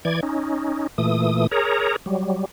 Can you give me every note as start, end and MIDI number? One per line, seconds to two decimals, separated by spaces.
0.05 0.20 52
0.05 0.20 74
0.05 0.20 92
0.23 0.87 61
0.23 0.87 63
0.98 1.47 46
0.98 1.47 52
0.98 1.47 57
0.98 1.47 87
1.51 1.96 68
1.51 1.96 70
1.51 1.96 73
1.51 1.96 82
2.06 2.45 54
2.06 2.45 55